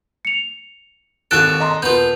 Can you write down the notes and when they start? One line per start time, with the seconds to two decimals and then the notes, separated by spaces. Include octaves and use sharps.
0.25 C#7 F7
1.31 G#1 D#2 G#4 A4 F#6 A6 D7
1.60 D#5 A#5 C6
1.82 E1 B3 F4 G6